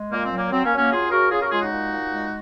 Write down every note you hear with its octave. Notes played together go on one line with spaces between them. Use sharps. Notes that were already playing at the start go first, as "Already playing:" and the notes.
Already playing: G#3
A#2 A#3
C4
F#3
A#3
F#3 C4
A#3 C#4
F#3
A#3 C#4
C#3 F4 G#4
C#3 F#4 A#4
C#3 F4 G#4
F#4 A#4
G#3 F4 G#4
D#4 F#4
A#2
A#2
G#3